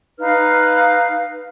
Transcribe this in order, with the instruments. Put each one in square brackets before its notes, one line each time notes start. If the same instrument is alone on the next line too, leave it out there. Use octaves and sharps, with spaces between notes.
[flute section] D#4 B4 F5 F6